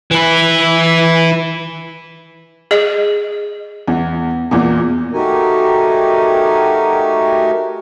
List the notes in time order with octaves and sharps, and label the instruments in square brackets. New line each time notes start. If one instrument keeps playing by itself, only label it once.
[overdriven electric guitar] E3 E4
[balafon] G#4 D#5
[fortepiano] E2
E2 A#2
[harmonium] A3 D#4 F#4 G4 A#4 G#5